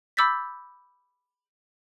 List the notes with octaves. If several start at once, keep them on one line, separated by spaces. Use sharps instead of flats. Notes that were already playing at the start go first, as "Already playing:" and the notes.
B5 D6 E6 G6 A6 B6